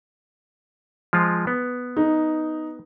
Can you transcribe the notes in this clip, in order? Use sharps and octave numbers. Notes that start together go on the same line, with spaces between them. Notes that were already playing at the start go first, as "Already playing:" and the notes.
F3 G#3 F4
B3
D#4